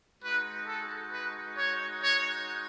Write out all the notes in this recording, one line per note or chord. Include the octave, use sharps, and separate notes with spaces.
G#3 D#4 F#4 B4
A4
B4
C#5
C#5